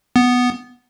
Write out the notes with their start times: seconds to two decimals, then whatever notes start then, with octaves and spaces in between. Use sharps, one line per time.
0.16 B3